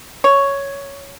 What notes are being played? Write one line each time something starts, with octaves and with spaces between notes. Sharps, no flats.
C#5